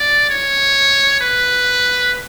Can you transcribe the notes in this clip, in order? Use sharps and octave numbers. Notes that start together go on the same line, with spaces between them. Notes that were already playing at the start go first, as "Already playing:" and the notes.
Already playing: D5
C#5
B4